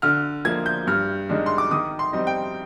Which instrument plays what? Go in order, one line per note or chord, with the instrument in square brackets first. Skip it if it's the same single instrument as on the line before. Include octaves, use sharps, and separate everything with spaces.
[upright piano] D3 F6
F3 A#3 G#6
G6
G2 F6
D#3 G#3 D4
C6
D6
D#3 D#6
C6
G3 C4 D#4
G5